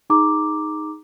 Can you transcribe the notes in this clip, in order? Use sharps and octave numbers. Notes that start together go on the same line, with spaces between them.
D#4 G#4 A#5 D6